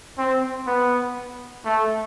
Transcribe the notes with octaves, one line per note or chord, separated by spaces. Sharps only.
C4
B3
A3